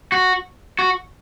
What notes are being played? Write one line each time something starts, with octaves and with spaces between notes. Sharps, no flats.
F#4
F#4